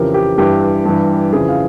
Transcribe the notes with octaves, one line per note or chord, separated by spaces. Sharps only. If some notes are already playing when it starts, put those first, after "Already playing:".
Already playing: F2 C#3 E3 G4 A#4
G4
G2 E3 G4
G2 E3
F2 C#3 E3 G#4
F5